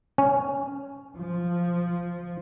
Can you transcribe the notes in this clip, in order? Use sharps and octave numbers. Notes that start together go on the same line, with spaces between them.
C#4
F3